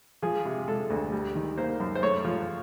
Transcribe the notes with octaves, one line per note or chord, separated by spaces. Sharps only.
F3 G#4
C3
G#3 A4
D2
G3
D#3
A#3 C5
F#2
C5
A3 C#5
F3